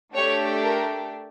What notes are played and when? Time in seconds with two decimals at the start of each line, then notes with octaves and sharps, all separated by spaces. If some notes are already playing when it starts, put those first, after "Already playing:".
0.15 A3 D4 G4 C#5
0.63 A#4